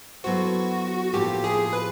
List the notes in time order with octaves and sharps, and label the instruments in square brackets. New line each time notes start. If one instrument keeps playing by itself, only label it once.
[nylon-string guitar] F#3 B3 E4 A4 C5 [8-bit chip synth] F#4
[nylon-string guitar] A2 F3 A#3 [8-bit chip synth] G4
[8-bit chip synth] G#4
B4